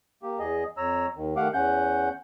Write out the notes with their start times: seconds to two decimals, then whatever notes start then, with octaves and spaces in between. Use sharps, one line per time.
0.23 A#3 G4
0.39 E2 G#4 D#5
0.77 F2 C#5 A#5 E6
1.16 D#2 D#3
1.36 D#3 A3 G4 F5 F#5 D6
1.54 E2 C#4 F#5 G6